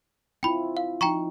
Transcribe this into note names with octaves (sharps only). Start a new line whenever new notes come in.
C4 E4 F4 G5 B5
F5
F3 D#4 G5 A#5 C#6